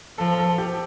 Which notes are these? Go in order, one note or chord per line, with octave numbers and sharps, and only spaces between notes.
F3 A4
A4
G4